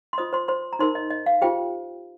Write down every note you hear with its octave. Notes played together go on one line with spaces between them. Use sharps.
C6
F4 C5 D#5 D#6
C5 C6
C5 C6
A#5
D#4 A#4 C5 C6
D#5
D#5
F5
F4 G4 C5 G5